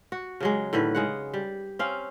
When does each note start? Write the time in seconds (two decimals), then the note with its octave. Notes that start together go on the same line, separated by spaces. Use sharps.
0.12 F#4
0.40 C#3 F#3 G#3
0.73 A2 D3 D#3 B4
0.95 C#3 G#3 F#5
1.34 G3
1.79 C4 C#4 F5